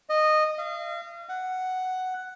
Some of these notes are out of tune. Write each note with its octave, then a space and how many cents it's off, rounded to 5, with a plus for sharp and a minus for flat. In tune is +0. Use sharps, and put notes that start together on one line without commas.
D#5 -15
F5 -35
F#5 +5